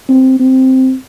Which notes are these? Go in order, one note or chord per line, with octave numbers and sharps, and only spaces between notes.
C4
C4